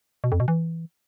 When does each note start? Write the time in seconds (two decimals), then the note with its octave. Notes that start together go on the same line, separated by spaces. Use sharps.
0.24 B2
0.32 F2
0.40 B2
0.48 E3